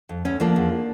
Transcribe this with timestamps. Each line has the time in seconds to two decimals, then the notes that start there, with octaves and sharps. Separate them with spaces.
0.09 F2
0.25 D2 C#4
0.40 F3 A#3 D4
0.56 E2